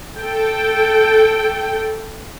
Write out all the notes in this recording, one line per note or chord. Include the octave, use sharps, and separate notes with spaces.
A4 G5